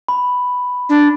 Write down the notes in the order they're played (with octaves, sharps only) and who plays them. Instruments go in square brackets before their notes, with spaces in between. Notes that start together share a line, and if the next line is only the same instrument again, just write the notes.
[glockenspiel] B5
[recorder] D4